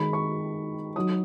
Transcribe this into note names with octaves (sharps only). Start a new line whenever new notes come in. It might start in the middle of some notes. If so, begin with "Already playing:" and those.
Already playing: D#3 G#3 D#4 B5
C#6
F#3 D#4 D#6